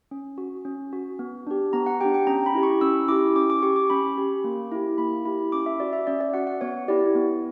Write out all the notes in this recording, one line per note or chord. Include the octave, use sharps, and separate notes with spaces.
C#4
F#4
C#4
F#4
B3
D4 G4
B3 A#5
F#5
D4 G4 G5
G5
C#4 A#5
B5
E4 G4
C#6
C#4 E6
E4 G4 D6
C#4 D6
D6
G4 C#6
D6
C#4 B5
G4
A#3
E4 G4
A#3 B5
E4 G4 B5
C#4 D6
E5
F#4 D5
E5
C#4 D5
D5
F#4 F#5
F#5
B3 C#5
E4 G4 D5
B3